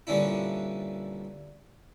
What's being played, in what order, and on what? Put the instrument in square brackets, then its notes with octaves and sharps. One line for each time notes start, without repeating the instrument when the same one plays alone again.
[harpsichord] G2 A#2 D3 C#4 D4 E4